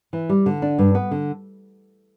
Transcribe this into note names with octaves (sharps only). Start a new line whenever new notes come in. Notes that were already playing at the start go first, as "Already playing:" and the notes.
E3
G3
D3
D4
G2
B3
D3